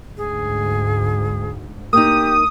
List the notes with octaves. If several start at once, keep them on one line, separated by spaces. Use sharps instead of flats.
D2 G#2 G#4
A#3 D#4 G4 D#6